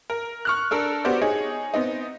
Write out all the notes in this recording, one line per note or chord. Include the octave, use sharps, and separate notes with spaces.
A#4
C#6 F6 F#6
D4 A4 A#4
B3 F#4 G4 C5 D5
D#4 G#4 C#5
B3 C4 D#4